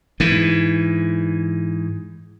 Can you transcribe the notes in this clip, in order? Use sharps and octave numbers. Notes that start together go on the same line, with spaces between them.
G#2 E3